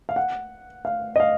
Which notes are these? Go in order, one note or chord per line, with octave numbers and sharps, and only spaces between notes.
F5
F#5
F5
D#5
F5